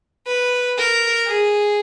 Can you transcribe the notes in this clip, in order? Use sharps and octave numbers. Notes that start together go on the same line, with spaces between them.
B4
A#4
G#4